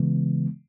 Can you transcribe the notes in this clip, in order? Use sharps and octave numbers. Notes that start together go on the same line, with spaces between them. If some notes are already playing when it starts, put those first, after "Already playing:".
Already playing: C#3 E3 G#3 B3